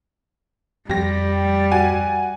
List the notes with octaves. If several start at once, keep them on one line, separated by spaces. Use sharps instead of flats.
F2 G3 G4 A#6
F#4 G#5